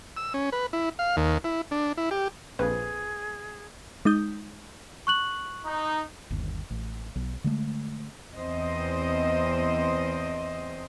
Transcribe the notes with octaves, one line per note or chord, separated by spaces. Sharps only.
E6
C#4
B4
E4
F5
D#2
E4
D4
E4
G4
A#1 F2 G#4 B4
G#3 D#4 D#6 G6
C#6 F#6 F#7
D#4
G1 D#2
A1
B1
D3 G#3 A3
E2 C4 C5 D#5